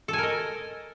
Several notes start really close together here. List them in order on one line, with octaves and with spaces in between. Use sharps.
A4 G#5 A#4 D#5